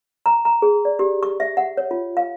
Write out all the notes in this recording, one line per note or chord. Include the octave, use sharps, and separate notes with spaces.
A#5
A#5
G#4
D5
G4
C#6
E5
F#5
C#5
F4
F5